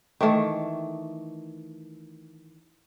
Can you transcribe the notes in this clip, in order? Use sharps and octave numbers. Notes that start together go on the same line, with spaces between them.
D#3 E3 A3